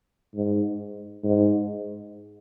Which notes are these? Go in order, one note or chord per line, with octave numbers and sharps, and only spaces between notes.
G#2
G#2